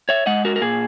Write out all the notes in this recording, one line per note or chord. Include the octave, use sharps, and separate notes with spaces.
C#5 E5
G#3 D#5 F#5
F#4 A#4
A#4
A#2 G#4